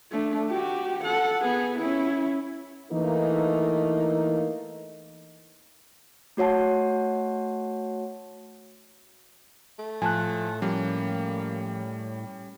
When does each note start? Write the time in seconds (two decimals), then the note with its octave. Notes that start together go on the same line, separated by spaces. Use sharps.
0.12 A3 D4
0.49 F#4 G4
1.04 A4 F#5
1.42 B3 G#4
1.79 C#4 E4
2.92 E3 A3 A#3 D#4
6.37 A3 F#4 C#5 F#5 A5
9.79 A3
10.02 A2 F3 G#5 A5 F#6
10.62 F3 G3 A#3 C#4